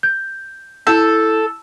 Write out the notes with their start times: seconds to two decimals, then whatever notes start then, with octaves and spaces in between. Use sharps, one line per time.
0.03 G6
0.87 E4 A4 G6